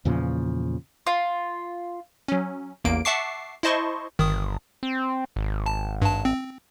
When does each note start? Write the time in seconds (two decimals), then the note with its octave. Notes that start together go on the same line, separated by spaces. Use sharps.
0.05 E2 A#2 C#3 F3
1.07 F4
2.28 F#3 C#4
2.84 A1 E2 A#3 D7
3.05 E5 F#5 A5 C#6 D6 C7
3.63 E4 C5 D#5 A5 C6 C#6
4.19 G1 D#3 D#6
4.83 C4
5.36 G#1
5.66 A5
6.02 G2 A5
6.25 C4